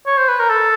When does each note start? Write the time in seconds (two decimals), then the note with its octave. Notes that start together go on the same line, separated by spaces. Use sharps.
0.07 C#5
0.17 C5
0.29 B4
0.39 A#4
0.50 A4